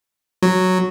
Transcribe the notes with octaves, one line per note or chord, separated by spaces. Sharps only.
F#3